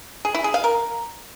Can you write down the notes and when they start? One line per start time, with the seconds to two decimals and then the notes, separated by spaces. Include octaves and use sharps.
0.25 G#4
0.34 E4
0.44 G#4
0.54 F5
0.64 A#4